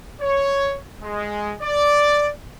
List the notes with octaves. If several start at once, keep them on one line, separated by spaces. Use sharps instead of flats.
C#5
G#3
D5